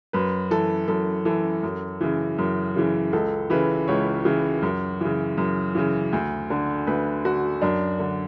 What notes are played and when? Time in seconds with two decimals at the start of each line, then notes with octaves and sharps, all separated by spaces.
0.13 F#2 B4
0.51 E3 A4
0.88 F#2 A4
1.25 E3 A4
1.63 F#2
2.01 C#3 E3
2.38 F#2
2.76 C#3 E3
3.13 C#2 A4
3.50 C#3 E3 B4
3.88 C#2 C#5
4.25 C#3 E3
4.62 F#2
5.01 C#3 E3
5.38 F#2
5.75 C#3 E3
6.13 D2
6.50 D3
6.87 D2 B4
7.25 D3 F#4
7.62 F#2 D4
7.99 D3